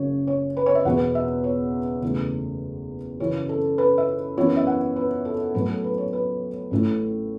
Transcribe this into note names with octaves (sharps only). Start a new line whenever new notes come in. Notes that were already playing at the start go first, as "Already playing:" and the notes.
Already playing: F#1 F#2 C#3 C#5
C#5
B4
C#5
E5
E2 B2 B3 F#5
E5
C#5
F#1 E2 E3 A3
F#2 C#3 E3 C#5
A4
B4
E5
F#2 E3 B3 E4 C#5
E5
F#5
B4
A4
A2 F#3 B3 B4
A4
B4
C#5
B4
A1 A2 A3 E4